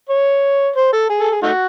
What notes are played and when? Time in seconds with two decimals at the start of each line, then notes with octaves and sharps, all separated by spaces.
0.09 C#5
0.76 C5
0.93 A4
1.10 G#4
1.20 A4
1.32 G#4
1.43 A3 D#4 F#4